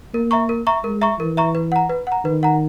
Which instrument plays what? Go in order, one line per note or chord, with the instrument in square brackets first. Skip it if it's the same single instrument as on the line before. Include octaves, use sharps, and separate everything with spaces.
[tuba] A#3 [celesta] A#4
[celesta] E5 A#5 C#6
A#4
E5 A#5 C#6
[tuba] G#3 [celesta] A#4
[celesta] E5 A#5 C#6
[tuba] E3 [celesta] A#4
[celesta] E5 A#5 C#6
B4
F#5 A#5
B4
F#5 A#5
[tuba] D#3 [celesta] B4
[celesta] F#5 A#5